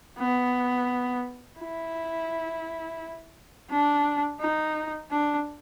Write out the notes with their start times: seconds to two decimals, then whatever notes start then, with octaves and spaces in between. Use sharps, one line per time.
0.18 B3
1.60 E4
3.70 D4
4.40 D#4
5.11 D4